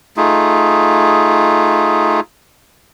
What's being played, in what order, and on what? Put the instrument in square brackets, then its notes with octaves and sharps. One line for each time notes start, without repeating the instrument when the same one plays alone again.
[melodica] A3 D#4 F4 G#4